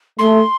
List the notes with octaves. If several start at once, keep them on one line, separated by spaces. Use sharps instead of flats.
A3 C6